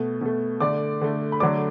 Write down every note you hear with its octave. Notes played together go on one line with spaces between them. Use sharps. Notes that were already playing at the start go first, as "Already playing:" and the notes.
Already playing: B2 A3
B2 A3
D3 A3 D5 D6
D3 A3
B5
D3 F#3 A3 D5 D6